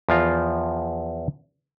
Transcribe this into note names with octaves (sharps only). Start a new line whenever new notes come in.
E2 F3 F4 A#5